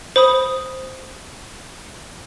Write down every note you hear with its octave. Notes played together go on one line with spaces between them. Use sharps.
C5 B5 D#6